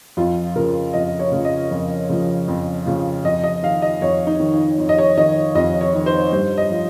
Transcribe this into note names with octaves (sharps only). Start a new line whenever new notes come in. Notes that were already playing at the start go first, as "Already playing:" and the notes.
F2 F4
C#3 F3 A#4
F2 D#5
C#5
C#3 F3
D#5
F2
C#3 F3
F2
C#3 F3
F2 D#5
D#5
D#3 F5
D#5
F2 C#5
D#4
D#3
D#4
F2
D#5
C#5
D#3 D#5
F2 D#5
C#5
D#3
C5
G2 C5
D#5
F3